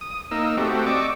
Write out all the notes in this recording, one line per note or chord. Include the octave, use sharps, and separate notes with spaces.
D#6
A#3 D#4 E6
A3 C4 F#4 G4
D5 D#5 C#6 D6 E6